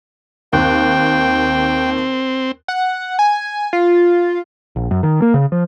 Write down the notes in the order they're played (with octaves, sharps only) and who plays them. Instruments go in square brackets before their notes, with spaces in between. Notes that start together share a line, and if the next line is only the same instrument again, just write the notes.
[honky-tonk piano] D#2 F#6 [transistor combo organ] C4 [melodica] G5
[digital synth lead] F#5
G#5
F4
[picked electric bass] A#1
F#2
D#3
A#3
C#3
F3